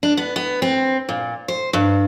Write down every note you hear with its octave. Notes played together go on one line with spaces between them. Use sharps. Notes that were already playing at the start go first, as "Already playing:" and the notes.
D4
B3
B3
C4
A#2
C5
G2